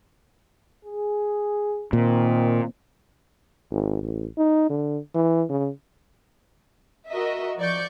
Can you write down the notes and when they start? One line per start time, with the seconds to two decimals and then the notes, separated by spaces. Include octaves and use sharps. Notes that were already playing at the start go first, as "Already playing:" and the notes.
0.85 G#4
1.93 A#2 D#3 C4
3.71 G#1
4.02 A1
4.38 D#4
4.69 D3
5.15 E3
5.49 C#3
7.10 F#4 A#4 D#5 E5
7.57 F3 D5 C#6 G6